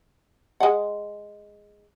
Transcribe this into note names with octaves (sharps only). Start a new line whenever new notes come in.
G#3 F#5